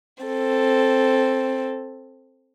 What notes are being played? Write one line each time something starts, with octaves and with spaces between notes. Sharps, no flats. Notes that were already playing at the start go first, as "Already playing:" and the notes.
C4 A4